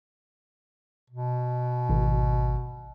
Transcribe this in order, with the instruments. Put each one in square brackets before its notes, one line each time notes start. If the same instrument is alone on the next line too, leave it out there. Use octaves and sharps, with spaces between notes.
[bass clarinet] B2
[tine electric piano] G#1